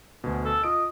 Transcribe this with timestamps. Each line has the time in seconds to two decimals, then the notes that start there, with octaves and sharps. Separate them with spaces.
0.24 D2 B2
0.45 A4
0.64 F4 D#5 D7